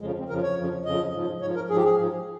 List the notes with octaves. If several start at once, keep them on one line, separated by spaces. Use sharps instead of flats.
F2 C#3 F3 G#3
C4
F2 C#3 F3 A#4
C#5
F2 C#3 F3
F2 C#3 F3 D#5
G#2 F3
G#2 F3 C#5
A#4
G#2 F3 G#4
G4
G#4
G#2 F3